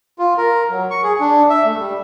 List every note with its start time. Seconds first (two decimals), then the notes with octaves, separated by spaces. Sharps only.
0.19 F4
0.38 A#4
0.70 F#3
0.91 C#6
1.03 G#4
1.20 D4
1.50 E5
1.65 A3
1.79 G3